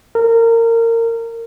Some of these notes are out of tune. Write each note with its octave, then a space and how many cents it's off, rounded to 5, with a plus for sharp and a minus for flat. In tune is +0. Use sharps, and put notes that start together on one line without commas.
A#4 -25